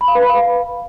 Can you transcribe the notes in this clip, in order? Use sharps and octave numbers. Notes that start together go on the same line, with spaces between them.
B5
F5
B4
B5
F5